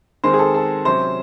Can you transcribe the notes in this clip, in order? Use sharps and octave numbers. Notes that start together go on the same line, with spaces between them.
D#3 G#3 C4 C5
G#4
A4
A4
C3 F#3 C#4 C5